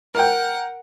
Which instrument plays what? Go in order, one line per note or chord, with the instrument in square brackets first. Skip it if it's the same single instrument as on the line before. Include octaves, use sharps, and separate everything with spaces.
[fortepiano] A#4 G5 [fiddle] F#5